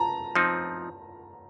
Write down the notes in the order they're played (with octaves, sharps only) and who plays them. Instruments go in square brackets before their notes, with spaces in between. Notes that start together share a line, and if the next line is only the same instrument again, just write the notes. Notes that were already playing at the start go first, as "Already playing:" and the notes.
Already playing: [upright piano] A5 A#5
[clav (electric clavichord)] F3 C4 D#4